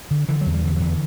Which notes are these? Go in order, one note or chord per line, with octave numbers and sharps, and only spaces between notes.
D3
D3 E3
F#3
E2
G3
D3 E3
F#3
E2 E3